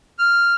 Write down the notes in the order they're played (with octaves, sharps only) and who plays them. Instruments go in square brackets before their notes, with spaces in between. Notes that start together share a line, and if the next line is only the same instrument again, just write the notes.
[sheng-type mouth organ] F6